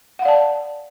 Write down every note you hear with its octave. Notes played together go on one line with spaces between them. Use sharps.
D5 F5 F#5 A5